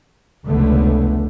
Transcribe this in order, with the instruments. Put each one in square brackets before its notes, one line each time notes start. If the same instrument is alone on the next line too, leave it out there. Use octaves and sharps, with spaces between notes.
[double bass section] F1 C#2 D3 A3 B3